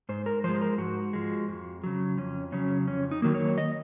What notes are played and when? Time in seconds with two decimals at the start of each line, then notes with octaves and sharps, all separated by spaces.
0.09 G#2 C5
0.26 A#4
0.44 F3 G#3 C5
0.62 A#4
0.78 G#2 F#4
1.13 F3 G#3
1.48 F2
1.84 C#3 F#3
2.17 F2 C#4
2.52 C#3 F#3 C#4
2.87 F2 C#4
3.11 D#4
3.22 D#3 F#3 A#3
3.35 C#5
3.58 D#5